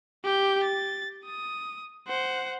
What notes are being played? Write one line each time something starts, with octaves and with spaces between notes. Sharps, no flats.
G4 G6
A6
D#6
C5 F#5